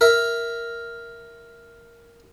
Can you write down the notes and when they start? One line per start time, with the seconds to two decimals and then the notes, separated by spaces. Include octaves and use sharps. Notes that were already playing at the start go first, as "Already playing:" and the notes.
0.01 A#4 E5